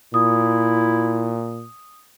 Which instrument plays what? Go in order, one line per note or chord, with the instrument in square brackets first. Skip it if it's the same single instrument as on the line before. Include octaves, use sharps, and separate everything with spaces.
[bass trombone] A#2 [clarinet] E4 [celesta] D#6